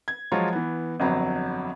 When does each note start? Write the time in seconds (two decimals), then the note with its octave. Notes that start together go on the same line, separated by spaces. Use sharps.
0.08 G#6
0.32 F3 F#3 G#3 F4 C#5
0.53 E3 B3
1.00 G1 F2 F#3